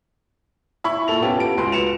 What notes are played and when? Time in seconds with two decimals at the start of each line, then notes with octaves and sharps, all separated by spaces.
0.84 E4 B5 C#6
1.08 A#2 A4 F7
1.22 B3 C#4 F4 G4 A4
1.40 D7
1.57 C#2 F#4 B4 C6
1.72 C#7 E7 F7